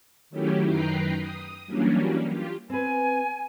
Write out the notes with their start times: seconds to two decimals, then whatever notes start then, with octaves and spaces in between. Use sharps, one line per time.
0.30 D#3 F#3 A3 C#4 E4 G4
0.66 F#2 D#3 B4 G5 A#5 C7
1.16 D#6
1.66 E3 F#3 G3 A#3 C#4 D4
2.28 F4 G4
2.70 C4 B4 G#5